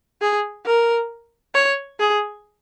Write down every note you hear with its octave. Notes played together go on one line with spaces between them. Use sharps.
G#4
A#4
C#5
G#4